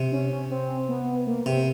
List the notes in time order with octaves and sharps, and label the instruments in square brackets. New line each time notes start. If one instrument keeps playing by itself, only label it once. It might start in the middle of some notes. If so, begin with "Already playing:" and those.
Already playing: [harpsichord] C3
[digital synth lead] C#4
C#4
C4
B3
A#3
[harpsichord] C3 [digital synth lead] C4